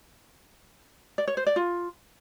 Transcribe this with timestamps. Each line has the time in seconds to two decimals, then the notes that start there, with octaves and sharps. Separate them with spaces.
1.18 D5
1.28 C#5
1.37 C5
1.47 D5
1.56 F4